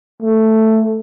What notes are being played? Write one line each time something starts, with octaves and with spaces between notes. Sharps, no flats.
A3